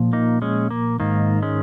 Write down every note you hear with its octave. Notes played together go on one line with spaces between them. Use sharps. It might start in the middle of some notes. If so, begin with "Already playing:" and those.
Already playing: A#2 F3
A#3 D#4
G#3 C#4
A#3
G#2 D#3 A#3
G#3 C#4